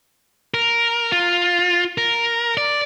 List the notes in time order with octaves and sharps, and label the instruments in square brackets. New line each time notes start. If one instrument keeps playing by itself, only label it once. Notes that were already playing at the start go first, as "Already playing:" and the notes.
[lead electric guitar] A#4
F4
A#4
D5